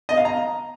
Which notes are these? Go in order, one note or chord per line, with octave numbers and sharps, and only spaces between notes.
D#5
F5
A#5